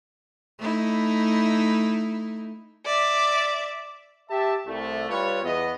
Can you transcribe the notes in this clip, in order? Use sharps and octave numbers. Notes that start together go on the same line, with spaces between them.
A3 D#4 E4
D5 E5
G4 E5 A5
C2 A3
G3 F4 B4 C#5
E2 B3 D#5